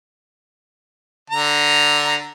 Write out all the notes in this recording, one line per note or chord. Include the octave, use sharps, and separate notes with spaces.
D3 A#5